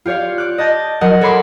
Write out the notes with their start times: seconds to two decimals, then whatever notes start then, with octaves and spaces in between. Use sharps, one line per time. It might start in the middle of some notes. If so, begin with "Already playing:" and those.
0.05 F4 G4 C#5 D5 F5
0.38 D6 F#6
0.58 D#5 A5 G6 A6
1.01 F#3 A#4 D#5 F#5
1.21 A4 C#5 B5 C6 D6